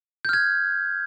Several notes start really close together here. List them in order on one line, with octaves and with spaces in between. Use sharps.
G6 F6 G#6